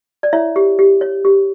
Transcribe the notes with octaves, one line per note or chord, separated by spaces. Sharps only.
D5
E4 C#5 E5
G4
G4
C#5
G4